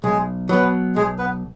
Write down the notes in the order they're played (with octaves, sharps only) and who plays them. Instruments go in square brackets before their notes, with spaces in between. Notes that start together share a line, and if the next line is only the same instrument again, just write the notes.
[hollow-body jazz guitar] B1 [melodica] G#3 G#4
[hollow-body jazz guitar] B2 F#3 [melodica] B3 B4
[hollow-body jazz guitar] B1 [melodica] G#3 G#4
[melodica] B3 B4